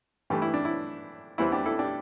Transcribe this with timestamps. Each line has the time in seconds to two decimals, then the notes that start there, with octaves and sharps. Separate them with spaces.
0.30 G2 E3 A3 G4
0.42 E4
0.54 D4
0.65 E4
1.38 E2 E3 G3 C4 E4
1.52 D4 G4
1.66 E4 A4
1.79 D4 G4